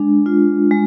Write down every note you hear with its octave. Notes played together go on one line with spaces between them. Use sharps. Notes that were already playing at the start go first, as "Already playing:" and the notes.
Already playing: G#3 D4
F4
G#3